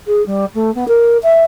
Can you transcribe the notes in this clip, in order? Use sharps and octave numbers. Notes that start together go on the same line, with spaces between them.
G#4
G3
A3
B3
A#4
E5